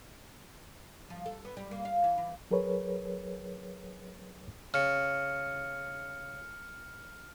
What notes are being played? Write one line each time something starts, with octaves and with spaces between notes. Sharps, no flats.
F3
A4
B3
G3
A#3
F5
E3
E3
F#3 G#4 A#4 B4 C#5
C#3 F6 C#7